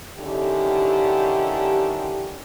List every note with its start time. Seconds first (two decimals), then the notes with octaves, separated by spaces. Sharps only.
0.18 D3 D#3 C#4 E4 G4